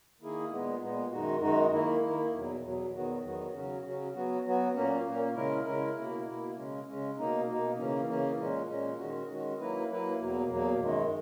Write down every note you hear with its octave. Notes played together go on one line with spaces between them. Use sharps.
D#3 A#3 E4 G#4
A#2 G#3 B3
A#2 G#3 B3
F#2 D#3 G#3 D#4 F#4
F#2 D#3 G#3 D#4 F#4
D#3 A#3 E4
D#3 A#3 E4
E2 B2 F#3
E2 B2 F#3
E2 D#3 F#3 B3 F#4
E2 D#3 F#3 B3 F#4
C#3 F#3 C#4 F#4
C#3 F#3 C#4 F#4
F#3 B3 F#4
F#3 B3 F#4
A#2 A#3 C#4
A#2 A#3 C#4
C#3 G#3 C#4 E4 A#4
C#3 G#3 C#4 E4 A#4
B2 A#3 E4
B2 A#3 E4
C#3 G#3 C#4
C#3 G#3 C#4
B2 A#3 D#4
B2 A#3 D#4
C#3 E3 A#3 C#4
C#3 E3 A#3 C#4
A#2 G#3 C#4
A#2 G#3 C#4
D#3 G#3 C#4 F#4
D#3 G#3 C#4 F#4
F#3 A#3 E4 B4
F#3 A#3 E4 B4
E2 B2 F#3 A#3
E2 B2 F#3 A#3
F#2 D#3 G#3